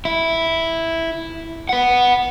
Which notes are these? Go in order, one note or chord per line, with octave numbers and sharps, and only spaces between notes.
E4
B4 F#5